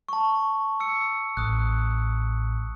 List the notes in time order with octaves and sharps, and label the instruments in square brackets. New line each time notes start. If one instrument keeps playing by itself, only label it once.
[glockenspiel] A5 C#6
E6 C#7
[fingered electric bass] A1 [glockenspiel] D#6 F#6